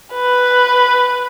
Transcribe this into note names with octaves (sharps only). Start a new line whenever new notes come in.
B4